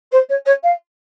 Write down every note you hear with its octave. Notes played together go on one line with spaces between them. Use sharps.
C5
C#5
C#5
F5